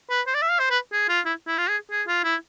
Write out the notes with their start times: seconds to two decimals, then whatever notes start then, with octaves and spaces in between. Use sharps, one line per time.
0.10 B4
0.27 C5
0.34 D5
0.42 E5
0.50 F5
0.59 C5
0.70 B4
0.92 G#4
1.09 F4
1.25 E4
1.47 E4
1.58 F4
1.69 G#4
1.91 G#4
2.07 F4
2.24 E4